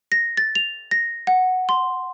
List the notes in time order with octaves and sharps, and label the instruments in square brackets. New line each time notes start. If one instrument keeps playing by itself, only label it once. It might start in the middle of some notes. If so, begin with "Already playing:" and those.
[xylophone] A#6
A6
F7
A#6
F#5
C6